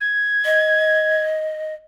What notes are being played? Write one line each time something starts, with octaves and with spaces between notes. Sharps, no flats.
G#6
D#5